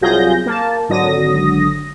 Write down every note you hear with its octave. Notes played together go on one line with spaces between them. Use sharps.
C2 F#3 F4 G#4 G6 A#6
A#3 A5
G#1 D3 F#3 D#6 A#6